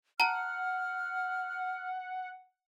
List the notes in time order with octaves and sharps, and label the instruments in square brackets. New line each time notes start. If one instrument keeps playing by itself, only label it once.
[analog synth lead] F#5 [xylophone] A5 A#5 [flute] F6